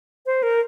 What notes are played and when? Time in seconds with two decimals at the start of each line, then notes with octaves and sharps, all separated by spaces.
0.26 C5
0.43 A#4